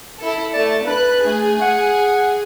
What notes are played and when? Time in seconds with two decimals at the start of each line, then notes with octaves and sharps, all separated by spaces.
0.19 E4 A4
0.54 A3 D5 A5
0.86 D4 B4 F#6
1.25 A3 G#4
1.61 F#5